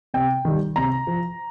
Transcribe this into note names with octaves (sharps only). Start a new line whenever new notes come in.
C3 G5
D#3 G3
C3 A#5
F3